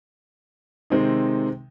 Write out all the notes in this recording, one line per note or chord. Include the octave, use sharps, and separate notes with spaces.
C3 D#3 G#3 C4 D#4